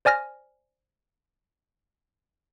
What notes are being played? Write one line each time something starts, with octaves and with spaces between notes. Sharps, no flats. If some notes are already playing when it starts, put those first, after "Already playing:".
C5 D5 G#5 F6 A#6